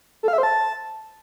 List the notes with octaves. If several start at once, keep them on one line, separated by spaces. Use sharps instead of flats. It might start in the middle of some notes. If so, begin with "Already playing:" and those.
A4
F5
E5
C5
A5